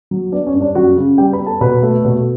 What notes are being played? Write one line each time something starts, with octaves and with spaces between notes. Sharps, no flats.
F#3
B3 D4 D5
C#4 C#5
G2
D4 D5
F#2 F#4 F#5
C#3
G3 G4 G5
B4 B5
B3
A4 A5
B2 B4 B5
A3
B2